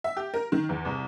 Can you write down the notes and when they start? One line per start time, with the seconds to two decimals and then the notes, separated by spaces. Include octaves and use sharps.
0.04 E5
0.17 G4
0.34 A#4
0.52 D#3
0.69 E2
0.85 C2